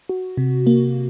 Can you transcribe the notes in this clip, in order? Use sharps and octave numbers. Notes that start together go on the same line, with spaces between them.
F#4
C3
A#3